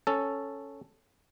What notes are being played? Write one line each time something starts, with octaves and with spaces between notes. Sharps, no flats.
C#4 A4